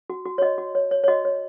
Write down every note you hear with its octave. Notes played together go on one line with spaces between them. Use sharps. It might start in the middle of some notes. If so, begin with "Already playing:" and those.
F#4
F#4
C#5
F#4 D#5
F#4
C#5
C#5
C#5
F#4 D#5
C#5